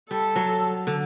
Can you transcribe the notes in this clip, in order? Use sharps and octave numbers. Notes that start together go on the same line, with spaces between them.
G3 A4
F#3
D3